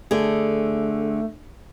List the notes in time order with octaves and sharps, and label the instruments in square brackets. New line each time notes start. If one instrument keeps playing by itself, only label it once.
[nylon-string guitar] D3 G#4 [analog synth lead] A3